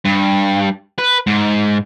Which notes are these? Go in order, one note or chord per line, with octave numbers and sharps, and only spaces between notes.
G2
B4
G#2